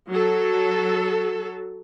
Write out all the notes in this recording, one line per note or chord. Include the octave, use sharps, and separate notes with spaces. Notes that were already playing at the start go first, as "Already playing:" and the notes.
F#3 A4